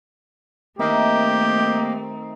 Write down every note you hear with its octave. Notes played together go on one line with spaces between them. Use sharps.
D#3 A3 A#3 C4 D#4 G4 E5